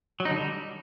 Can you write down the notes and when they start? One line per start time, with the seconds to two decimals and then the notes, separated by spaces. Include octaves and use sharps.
0.20 F#3
0.25 D#4
0.31 D3
0.36 G3